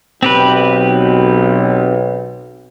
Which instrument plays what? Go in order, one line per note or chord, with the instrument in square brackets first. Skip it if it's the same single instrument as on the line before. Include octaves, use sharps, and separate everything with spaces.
[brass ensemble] B1 [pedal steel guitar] C4 G4 B4